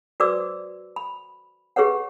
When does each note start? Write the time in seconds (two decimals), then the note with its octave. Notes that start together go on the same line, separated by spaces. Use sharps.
0.20 F#4 B4 C5 D5 D6 E6
0.96 B5
1.76 G4 G#4 B4 C#5 F#5